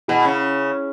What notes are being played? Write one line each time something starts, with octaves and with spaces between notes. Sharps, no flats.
B2 E4 G#4
C#3